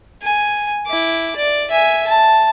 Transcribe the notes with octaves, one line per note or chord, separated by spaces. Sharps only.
G#5
E4 D6
D5
E5 G#5
A5